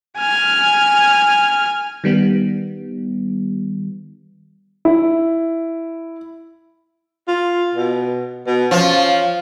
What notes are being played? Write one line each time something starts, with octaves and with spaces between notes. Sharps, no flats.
G#5 F6
D#3 G3 B3
E4
F4
B2
B2
F3 C#4